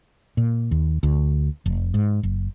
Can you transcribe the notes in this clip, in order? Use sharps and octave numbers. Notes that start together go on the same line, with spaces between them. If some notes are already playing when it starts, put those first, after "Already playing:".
A#2
D#2
D2
F1
G#2
F#1